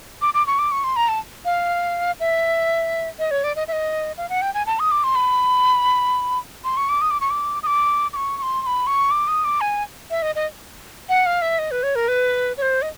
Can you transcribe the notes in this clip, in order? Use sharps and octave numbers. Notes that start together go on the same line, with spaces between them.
D6
D6
C#6
D6
C#6
C6
A#5
A5
F5
E5
D#5
C#5
D5
D#5
E5
D#5
F5
F#5
G5
G#5
A5
D#6
D6
C6
B5
C6
C#6
D6
D#6
D6
C#6
D6
D#6
D6
D6
C#6
C#6
C6
C6
B5
C#6
D6
D#6
D6
G#5
E5
D#5
D#5
F#5
F5
E5
D#5
B4
C#5
A#4
B4
C#5
C5
D#5